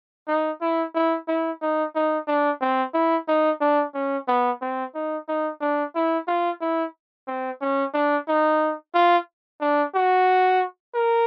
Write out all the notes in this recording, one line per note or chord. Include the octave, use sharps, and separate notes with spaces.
D#4
E4
E4
E4
D#4
D#4
D4
C4
E4
D#4
D4
C#4
B3
C4
D#4
D#4
D4
E4
F4
E4
C4
C#4
D4
D#4
F4
D4
F#4
A#4